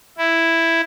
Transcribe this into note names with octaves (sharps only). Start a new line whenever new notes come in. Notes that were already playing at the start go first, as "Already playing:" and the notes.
E4